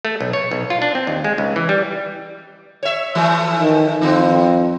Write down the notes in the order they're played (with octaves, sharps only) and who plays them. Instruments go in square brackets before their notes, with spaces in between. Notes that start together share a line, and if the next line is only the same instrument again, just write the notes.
[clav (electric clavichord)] A3
B1
C#5
B1
F4
D4
C4
D#2
G#3
C#2
E3
G3
[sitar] C#5 E5
E3 F3 A3
[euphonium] D#3
[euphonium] F2 [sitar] D#3 B3 C4